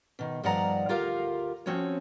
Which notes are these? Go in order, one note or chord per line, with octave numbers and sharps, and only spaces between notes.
B2 D#3
G2 D#3 F3 D5 F#5 A#5
D2 F4 G4 A#4 F5
F3 C4 C#4 F#4 C#5